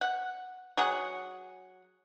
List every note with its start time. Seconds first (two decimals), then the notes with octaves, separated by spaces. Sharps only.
0.01 F#5
0.77 F#3 G#4 F#5